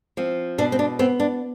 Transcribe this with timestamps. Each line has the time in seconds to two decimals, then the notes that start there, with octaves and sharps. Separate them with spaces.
0.17 F3 C4
0.58 B2 D4
0.72 C4
0.79 D4
0.99 B3 C4
1.20 D4